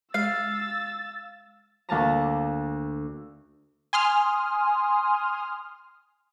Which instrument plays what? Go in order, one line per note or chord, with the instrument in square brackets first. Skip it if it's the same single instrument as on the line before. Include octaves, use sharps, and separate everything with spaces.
[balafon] G#3 [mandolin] F5 [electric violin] E6 A6
[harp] D2 A#3 A5 A#5
[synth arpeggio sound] G#5 C6 D#6 F6